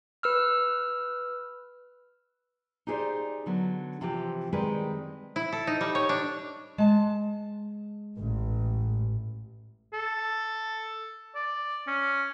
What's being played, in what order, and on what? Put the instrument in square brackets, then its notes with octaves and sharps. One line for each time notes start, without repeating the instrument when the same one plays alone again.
[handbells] B4 E6 F6
[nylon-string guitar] D#4 G4 G#4 A#4 C5 D5
D3 F#3 B3
C3 E3 F3 G4
D#3 G3 G#3 C4 G#4 B4
[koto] E4
A4
D#4
G3
C#5
D4
[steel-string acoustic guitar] G#3 A5
[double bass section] A1
[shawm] A4
D5
C#4